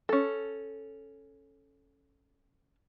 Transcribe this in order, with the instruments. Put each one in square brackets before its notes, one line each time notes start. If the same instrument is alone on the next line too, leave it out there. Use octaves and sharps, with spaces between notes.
[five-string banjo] C#4 A4